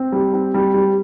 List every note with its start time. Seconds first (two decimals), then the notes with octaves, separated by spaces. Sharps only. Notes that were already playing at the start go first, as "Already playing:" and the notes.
Already playing: C4
0.12 G3
0.33 C4
0.54 G3
0.74 G3